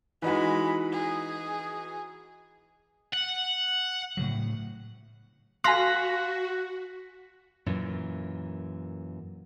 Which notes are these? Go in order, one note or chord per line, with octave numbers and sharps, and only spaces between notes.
E3 G#3 D#4 F#4 B5
G#4
F#5
A2 C#3 F#3
F#4 F5 G#5 C6 F#6 A#6 B6
F#2 A#2 E3